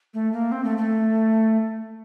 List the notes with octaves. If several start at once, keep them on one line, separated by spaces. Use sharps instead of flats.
A3
A#3
C4
A3
A3